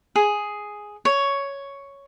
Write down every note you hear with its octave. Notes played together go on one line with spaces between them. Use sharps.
G#4
C#5